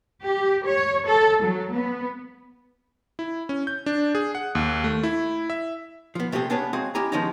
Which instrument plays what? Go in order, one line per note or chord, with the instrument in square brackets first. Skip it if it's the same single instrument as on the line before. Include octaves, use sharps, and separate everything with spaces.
[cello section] G4
C#5
A4
F#3
B3
[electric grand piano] E4
C#4
G6
D4
G#4
F#5
D#2
A3
E4
E5
[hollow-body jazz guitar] F3 B3
C3 A3 C4 G4 G#4
B3 C#4 D4 G#4 B4 C#5
G#3 C4 F#4 G#4 F5
C#4 E4 G4 D#5 G#5 A#5
D#3 F3 G#3 B3 C#4 D#4